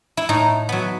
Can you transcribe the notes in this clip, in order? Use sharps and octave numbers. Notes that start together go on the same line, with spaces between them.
E4
A2 D#4
F#3 B3